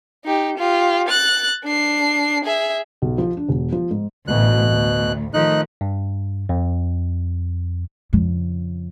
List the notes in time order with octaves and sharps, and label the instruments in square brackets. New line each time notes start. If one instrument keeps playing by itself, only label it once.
[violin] D#4 G4
F4 G4
F#6 A6
D4 C7
G#4 E5
[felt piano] B1
F3
D4
E1
F3
G#2
[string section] A1 D2 [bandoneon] B2 F#6
[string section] D2
[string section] D#3 F3 A3 [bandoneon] D#4 F#6
[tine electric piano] G2
F2
[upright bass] F2 C#3